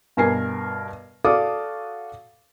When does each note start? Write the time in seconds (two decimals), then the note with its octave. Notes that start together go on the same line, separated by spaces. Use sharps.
0.17 G2 B2 A#4 G#5 C7
1.24 F#4 A4 D5 F5 D6 D#6